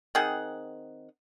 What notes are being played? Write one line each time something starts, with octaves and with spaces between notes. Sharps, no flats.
D#3 C4 G#4 F#5